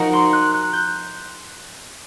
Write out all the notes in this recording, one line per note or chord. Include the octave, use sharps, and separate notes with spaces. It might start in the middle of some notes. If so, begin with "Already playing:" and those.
Already playing: F3 D#4 F#4 A#4 A#5
C6
F#6
F#6
G6